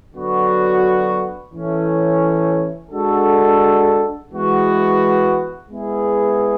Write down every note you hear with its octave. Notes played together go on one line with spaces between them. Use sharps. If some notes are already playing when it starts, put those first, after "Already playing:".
D3 F#3 B3 F#4
A2 E3 A3 C#4
G#3 D4 F#4 A4
E3 G#3 B3 F#4
G#3 B3 E4 G#4